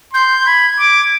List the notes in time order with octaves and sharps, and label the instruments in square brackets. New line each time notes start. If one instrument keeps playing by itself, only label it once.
[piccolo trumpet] C6 [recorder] G6
[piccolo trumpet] B5 [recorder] G#6
[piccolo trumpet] D6